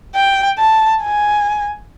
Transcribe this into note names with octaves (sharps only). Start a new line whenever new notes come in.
G5
A5
G#5